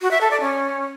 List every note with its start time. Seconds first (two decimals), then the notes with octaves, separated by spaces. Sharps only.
0.01 F#4
0.11 E5
0.21 A4
0.31 D5
0.41 C#4